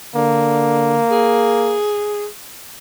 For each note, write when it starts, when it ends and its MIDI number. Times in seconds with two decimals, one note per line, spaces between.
0.15 1.02 50
0.15 1.78 58
1.11 2.27 68